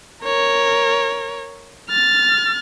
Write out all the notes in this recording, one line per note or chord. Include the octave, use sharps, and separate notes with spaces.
A#4 C#5
F6 A6